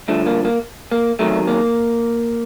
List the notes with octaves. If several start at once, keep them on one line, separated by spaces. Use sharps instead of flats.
G2 D3 F3 A3
A#3
A#3
A#3
E2 C3 D#3 F#3 A3
A#3